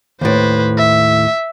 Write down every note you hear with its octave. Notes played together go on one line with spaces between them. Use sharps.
D#2 A2 B4 C5
E5